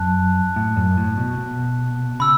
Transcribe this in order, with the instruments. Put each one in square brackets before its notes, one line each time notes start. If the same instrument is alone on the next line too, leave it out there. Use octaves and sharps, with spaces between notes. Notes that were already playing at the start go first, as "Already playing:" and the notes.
Already playing: [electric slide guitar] F#2 [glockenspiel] A5 F#6
[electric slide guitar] A2
F#2
A2
B2
B2
[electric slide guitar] C#3 [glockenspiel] B5 E6